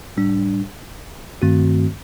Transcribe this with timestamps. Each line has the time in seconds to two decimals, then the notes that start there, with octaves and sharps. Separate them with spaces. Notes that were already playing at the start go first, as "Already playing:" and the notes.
0.17 A2 G3 D4
1.42 G2 D#3 A3 C4 F#4